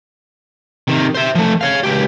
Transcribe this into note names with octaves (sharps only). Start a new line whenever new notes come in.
C3 D#3
C5 E5
F3 A3
C#5 F5
C#2 G4